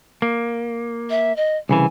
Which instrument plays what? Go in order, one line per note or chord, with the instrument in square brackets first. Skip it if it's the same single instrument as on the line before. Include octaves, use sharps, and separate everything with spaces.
[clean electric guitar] A#3
[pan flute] E5
D#5
[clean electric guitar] C2 C#3 E3 [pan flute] G#5